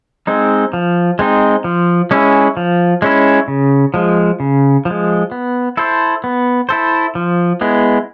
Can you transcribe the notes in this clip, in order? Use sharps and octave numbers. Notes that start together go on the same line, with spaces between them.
G#3 C4 D#4
F3
G#3 C4 D#4
F3
G#3 C#4 E4
F3
G#3 C#4 E4
C#3
F3 G#3
C#3
F3
G#3
B3
E4 A4 C5
B3
E4 A4 C5
F3
G#3 B3 E4